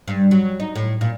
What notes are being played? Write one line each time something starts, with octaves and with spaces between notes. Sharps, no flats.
G2
F#3
D#4
A2
A#2